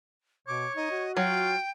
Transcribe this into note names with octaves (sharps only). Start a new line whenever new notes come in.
B2 C#5 D6
D#4 D#5
F#4
F#3 F4 G5